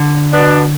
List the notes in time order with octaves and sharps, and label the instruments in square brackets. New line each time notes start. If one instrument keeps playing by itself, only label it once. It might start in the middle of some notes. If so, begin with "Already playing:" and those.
Already playing: [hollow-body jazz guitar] D3
[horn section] B2 B3 D4